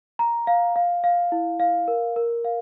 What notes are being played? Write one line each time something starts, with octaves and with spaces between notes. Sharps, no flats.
A#5
F5
F5
F5
E4
F5
A#4
A#4
F5